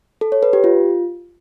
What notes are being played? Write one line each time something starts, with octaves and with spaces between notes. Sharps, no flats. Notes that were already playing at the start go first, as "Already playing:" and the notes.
A4
C#5
B4
G4
F4